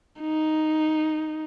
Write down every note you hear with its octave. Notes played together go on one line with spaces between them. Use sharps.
D#4